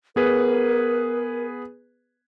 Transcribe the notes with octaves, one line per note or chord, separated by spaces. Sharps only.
B3 G#4 A#4 B4